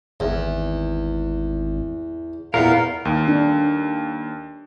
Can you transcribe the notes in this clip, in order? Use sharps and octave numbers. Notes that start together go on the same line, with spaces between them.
G#1 E2
E2 A#2 B3 A#4 F5
D#2
D4